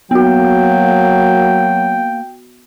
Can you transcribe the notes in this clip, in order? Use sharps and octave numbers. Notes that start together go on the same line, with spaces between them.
F#3 A#3 B3 F#4 G5